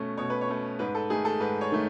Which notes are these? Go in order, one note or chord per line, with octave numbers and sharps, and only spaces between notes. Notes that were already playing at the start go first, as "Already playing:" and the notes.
Already playing: B2 A3 C#4
B2 C#5
B4
C#5
A3 C#4
G#2 B4
A4
D#3 A3 G#4
A4
G#2 B4
C#5
D#3 A3